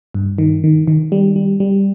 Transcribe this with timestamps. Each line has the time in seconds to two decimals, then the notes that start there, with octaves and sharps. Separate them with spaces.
0.14 G2
0.38 D#3
0.64 D#3
0.87 D#3
1.12 G3
1.36 G3
1.60 G3